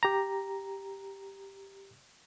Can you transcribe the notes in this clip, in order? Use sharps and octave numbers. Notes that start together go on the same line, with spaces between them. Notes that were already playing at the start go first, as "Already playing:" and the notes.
G4 A#5